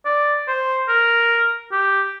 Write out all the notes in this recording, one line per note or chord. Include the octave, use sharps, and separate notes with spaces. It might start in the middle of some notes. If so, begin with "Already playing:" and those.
D5
C5
A#4
G4